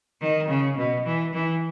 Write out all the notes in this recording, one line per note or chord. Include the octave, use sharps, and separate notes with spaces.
D#3
C#3
B2
E3
E3